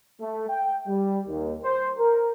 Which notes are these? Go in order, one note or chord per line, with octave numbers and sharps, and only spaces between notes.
A3
G5
G3
D#2
C5
A#4